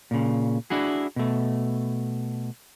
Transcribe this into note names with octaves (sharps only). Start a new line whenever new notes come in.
A#2 C#3
D4 E4 F#4 G#4
B2 A3